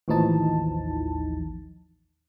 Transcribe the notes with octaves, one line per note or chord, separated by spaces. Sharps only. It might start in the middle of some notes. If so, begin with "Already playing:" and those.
A1 D#2 E3 F3 D#4 A5